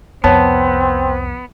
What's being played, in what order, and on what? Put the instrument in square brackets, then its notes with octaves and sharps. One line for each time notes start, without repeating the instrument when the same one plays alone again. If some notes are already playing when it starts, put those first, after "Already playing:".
[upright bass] C2 F2 [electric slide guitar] B3 [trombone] C4 [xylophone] C#5 A5